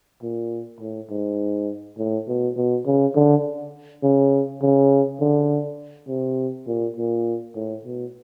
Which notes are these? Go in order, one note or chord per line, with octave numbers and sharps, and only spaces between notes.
A#2
A2
G#2
A2
B2
B2
C#3
D3
C#3
C#3
D3
C3
A#2
A#2
A2
B2